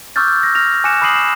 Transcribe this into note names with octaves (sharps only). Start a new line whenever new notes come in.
C#6 D6 E6 F6 G6 A6
A#6
F6 A#6 F7
G#5 D6 F#6 A#6 C#7 E7
B5 D6 D#6 C7 D#7 F#7
E7